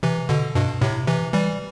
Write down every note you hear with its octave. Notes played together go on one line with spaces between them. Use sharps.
C3 E3
B2 D3
G2 B2
A2 C3
C3 E3
E3 G3